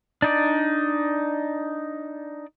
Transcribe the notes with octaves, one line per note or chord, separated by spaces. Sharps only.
D4 D#4 D5